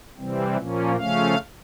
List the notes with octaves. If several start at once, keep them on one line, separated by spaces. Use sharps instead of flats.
C3 E3 G3 C4
A#2 F3 A#3 C#4
C#3 F3 A3 C#4 F5